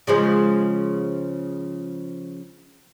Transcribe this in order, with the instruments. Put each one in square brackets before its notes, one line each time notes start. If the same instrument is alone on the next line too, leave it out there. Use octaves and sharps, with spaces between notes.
[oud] C#3 F3 G#3